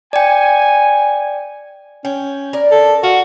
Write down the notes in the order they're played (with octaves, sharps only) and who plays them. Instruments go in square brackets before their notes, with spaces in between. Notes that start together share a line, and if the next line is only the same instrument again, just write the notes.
[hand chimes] D5 G5 [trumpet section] G#5
[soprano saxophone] C#4 [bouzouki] G5
[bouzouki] A#4 D5
[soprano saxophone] A4
[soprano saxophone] F#4 [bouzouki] F5